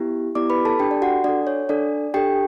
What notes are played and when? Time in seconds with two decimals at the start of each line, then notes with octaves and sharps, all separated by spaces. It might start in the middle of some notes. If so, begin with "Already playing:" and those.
Already playing: B3 E4 G4
0.35 B3 E4 G4 D5 D6
0.50 B4 B5
0.65 A4 A5
0.79 D4 G4 A4 G5
0.91 D5
1.02 F#4 F#5
1.24 D4 A4 D5
1.47 C#5
1.69 D4 A4 D5
2.14 D4 G4 A4 G5